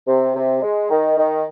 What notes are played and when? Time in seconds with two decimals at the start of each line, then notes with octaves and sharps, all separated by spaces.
0.07 C3
0.36 C3
0.62 G#3
0.90 D#3
1.17 D#3